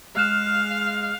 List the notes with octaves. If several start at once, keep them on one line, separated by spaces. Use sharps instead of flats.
G#3 F5 F6 F#6 E7